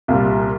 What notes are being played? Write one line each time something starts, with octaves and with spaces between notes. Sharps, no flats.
C2 A#2 G3 F4